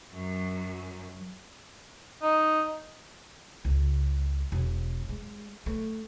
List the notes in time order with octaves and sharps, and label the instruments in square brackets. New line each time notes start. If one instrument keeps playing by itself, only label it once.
[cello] F#2 F#3
[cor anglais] D#4
[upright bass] C#2
E1
G#3
A3